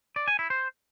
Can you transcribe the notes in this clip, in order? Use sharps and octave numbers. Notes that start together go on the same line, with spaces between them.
D5
G#5
E4
C5